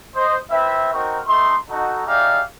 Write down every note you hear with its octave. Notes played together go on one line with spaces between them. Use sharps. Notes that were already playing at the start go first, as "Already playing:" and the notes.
C5 D#5
C4 E4 B4 E5
C4 D#4 F#4 A#4 C#6
A3 D#4 C6
D#4 F#4 A4
D#4 G4 G#4 D5 E5 F5